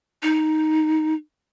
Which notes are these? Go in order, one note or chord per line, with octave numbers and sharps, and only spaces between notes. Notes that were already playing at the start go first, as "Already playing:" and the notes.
D#4